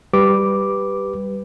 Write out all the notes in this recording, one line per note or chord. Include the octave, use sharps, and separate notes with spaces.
G3 G4 B4 D6